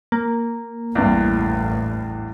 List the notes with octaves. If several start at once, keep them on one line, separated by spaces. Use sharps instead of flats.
A#3
A1 E2 G2